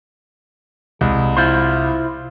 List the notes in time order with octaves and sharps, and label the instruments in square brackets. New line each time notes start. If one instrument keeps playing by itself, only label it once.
[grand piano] C2 [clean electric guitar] G#3
[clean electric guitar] E4 F4 C5